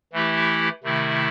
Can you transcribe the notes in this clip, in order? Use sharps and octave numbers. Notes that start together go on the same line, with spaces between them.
E3 A3 E4 G4
C3 D#3 A3 E4